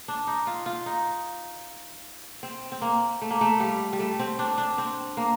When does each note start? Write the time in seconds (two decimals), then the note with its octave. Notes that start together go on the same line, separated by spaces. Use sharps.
0.08 D4
0.27 D#4
0.47 F4
0.66 F4
0.86 D#4
2.43 C4
2.72 C4
2.82 A#3
3.22 A3
3.30 A#3
3.41 A3
3.60 G3
3.93 G3
4.00 A3
4.19 C4
4.39 D4
4.58 D4
4.78 C4
5.17 A#3